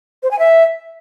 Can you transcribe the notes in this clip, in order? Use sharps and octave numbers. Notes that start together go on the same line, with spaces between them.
C5
G#5
E5